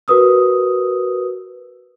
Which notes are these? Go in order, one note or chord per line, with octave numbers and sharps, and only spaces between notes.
F#4 A#4 B4 D#6 E6